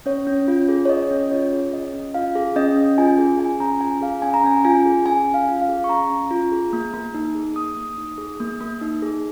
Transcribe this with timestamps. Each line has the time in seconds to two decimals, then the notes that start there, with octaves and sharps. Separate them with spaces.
0.06 C#4 C#5
0.27 C#4
0.48 F4
0.68 G#4
0.85 C#5
0.89 C#4 D#5
1.11 C#4
1.31 F4 C#5
1.52 G#4
1.73 C#4 D#5
1.94 C#4
2.14 F4 F5
2.35 G#4
2.56 C#4 D#5
2.77 C#4
2.98 F4 G#5
3.18 G#4
3.39 C#4 G#5
3.60 C#4 A#5
3.81 F4 G#5
4.01 G#4 F5
4.22 C#4 G#5
4.34 A#5
4.44 C#4 G#5
4.65 F4 G#5
4.85 G#4
5.06 C#4 G#5
5.26 C#4
5.34 F5
5.48 F4
5.62 F5
5.69 G#4
5.84 C#6
5.89 C#4 A#5
6.10 C#4
6.31 F4
6.52 G#4
6.73 A#3
6.93 A#3
7.14 D#4
7.35 G#4
7.56 A#3 D#6
7.77 A#3
7.98 D#4
8.18 G#4
8.40 A#3
8.60 A#3
8.81 D#4
9.02 G#4